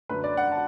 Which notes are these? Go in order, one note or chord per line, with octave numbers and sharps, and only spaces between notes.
F#2 D3 A3 B4
D5
F#5
A5